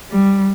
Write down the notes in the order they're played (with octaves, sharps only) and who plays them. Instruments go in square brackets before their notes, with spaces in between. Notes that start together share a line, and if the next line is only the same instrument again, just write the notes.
[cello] G3